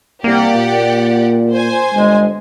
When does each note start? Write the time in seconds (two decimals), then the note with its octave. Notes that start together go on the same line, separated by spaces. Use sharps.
0.24 C2 A#3 G4 D5 F#5
0.54 A#2
1.53 C5 G#5
1.94 G1 G#3